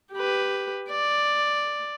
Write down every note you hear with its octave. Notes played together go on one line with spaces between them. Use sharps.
G4 B4
D5